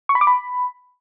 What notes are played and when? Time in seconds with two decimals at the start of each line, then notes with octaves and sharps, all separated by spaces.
0.09 C#6
0.15 B5
0.21 D6
0.27 B5